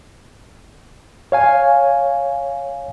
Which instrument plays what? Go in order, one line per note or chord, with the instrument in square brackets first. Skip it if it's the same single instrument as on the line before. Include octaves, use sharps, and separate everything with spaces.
[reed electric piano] C#5 F5 G#5